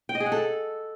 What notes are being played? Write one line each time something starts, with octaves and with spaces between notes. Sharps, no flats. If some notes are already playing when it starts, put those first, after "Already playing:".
G5
D#5
G#4
F#5
A4